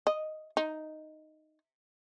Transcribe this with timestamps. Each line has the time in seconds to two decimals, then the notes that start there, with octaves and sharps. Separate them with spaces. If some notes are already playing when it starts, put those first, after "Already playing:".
0.07 D#5
0.57 D#4